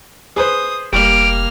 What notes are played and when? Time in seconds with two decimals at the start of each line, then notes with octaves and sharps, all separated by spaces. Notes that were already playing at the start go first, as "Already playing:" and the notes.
0.36 G#4 B4 C5 D#6
0.93 F1 G3 A#3 F6 D7